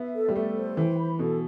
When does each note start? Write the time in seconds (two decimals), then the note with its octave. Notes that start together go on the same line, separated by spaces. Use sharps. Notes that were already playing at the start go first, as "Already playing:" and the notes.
Already playing: B3 E5
0.14 A4
0.28 G3
0.35 A3 A4
0.56 C5
0.77 E3 G5
0.98 B5
1.19 B2 A4